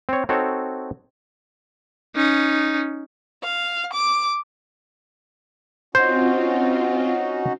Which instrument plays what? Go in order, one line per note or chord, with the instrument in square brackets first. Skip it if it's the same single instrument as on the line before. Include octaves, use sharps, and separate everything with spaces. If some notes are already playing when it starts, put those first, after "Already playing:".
[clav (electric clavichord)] C4 C#5
C4 D#4 F#4 A4 C#5
[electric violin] C#4 D#4
[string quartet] F5
D6
[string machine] C4 F4 [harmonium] C#4 D#4 F#4 [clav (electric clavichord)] C5